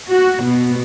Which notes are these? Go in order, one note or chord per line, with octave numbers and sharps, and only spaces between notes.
F#4
B2